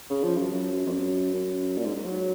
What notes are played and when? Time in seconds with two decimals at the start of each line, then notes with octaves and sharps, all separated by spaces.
0.10 C#3
0.23 F3
0.37 F#2
0.51 F#2
0.86 F2
0.92 F#2
1.33 F#2
1.77 A#2
1.85 G#2
1.95 G#2
2.06 F#3